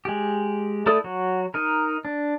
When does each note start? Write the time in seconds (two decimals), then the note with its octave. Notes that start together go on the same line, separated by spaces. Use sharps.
0.05 G#3 G4
0.86 A3 E4 A4 D5 D#6
1.04 F#3 F#4
1.54 D#4 A#4
2.05 D4